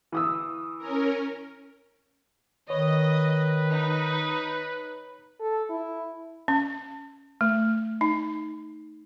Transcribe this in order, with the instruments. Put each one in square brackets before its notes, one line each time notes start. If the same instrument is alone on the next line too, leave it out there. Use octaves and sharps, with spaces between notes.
[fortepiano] E3 D#6 E6
[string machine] C#4 A#4
[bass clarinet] D#3 [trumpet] B4 [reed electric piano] C#5 [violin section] D#5
[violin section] D#4
[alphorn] A4
E4
[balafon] C#4
A3
D#4